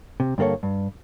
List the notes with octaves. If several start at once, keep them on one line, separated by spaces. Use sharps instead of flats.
C3
G2 D3 A#3 A4 C#5
G2